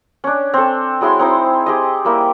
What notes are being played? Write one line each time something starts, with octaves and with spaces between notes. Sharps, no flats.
C#4 D4
C4 A4
F#3 G#3 E4 C6
C4 D#4 E4 C5
G4 G#4 D#5
G3 A#3 E4